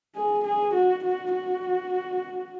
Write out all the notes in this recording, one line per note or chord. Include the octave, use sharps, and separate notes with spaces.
G#4
G#4
F#4
F#4
F#4